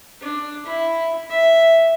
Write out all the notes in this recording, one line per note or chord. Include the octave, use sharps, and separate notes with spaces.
D4
E4
E5